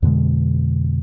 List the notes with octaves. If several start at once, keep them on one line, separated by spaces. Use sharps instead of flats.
F2 B2 D3 G#3